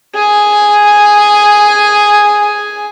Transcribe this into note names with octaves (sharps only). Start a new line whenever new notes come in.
G#4 G#5